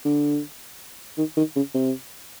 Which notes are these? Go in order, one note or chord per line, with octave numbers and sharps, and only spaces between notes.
D3
D#3
D#3
C#3
C3